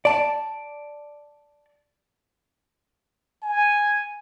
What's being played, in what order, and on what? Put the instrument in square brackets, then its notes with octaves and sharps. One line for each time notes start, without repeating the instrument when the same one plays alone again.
[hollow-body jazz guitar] D5 A5
[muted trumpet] G#5